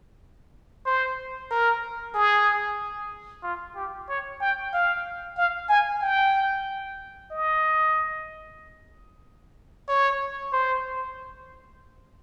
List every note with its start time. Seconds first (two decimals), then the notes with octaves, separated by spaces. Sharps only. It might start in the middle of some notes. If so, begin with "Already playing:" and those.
0.86 C5
1.51 A#4
2.14 G#4
3.43 F4
3.76 G4
4.09 C#5
4.41 G5
4.73 F5
5.37 F5
5.69 G#5
6.02 G5
7.31 D#5
9.89 C#5
10.53 C5